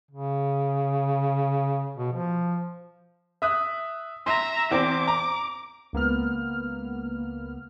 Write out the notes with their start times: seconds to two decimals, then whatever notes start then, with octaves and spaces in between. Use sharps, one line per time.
0.11 C#3
1.97 B2
2.12 F3
3.42 E5 D#6 F#6
4.26 E5 A#5 C6
4.71 E2 C4 D6
5.08 A#5
5.93 C#2 A#3 B3 F6